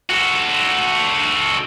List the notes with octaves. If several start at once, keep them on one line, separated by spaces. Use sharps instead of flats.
F#4 A4